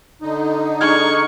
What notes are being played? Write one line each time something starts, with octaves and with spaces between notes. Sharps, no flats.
D3 D#4
D4 G#4 C#6 F6 G#6